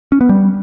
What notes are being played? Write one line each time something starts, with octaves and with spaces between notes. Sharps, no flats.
C#4
B3
G3